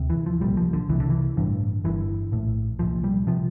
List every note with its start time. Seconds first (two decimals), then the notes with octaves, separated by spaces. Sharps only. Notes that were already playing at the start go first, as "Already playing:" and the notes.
Already playing: D2 C3
0.10 E3
0.26 F3
0.41 C2 A#2 G3
0.57 F3
0.73 D3
0.89 C2 C3 E3
1.00 D3
1.10 E3
1.37 A1 G2 D3
1.84 G1 G2 D3 E3
2.32 A#1 A2
2.79 C2 A#2 F3
3.04 G3
3.27 C3 F3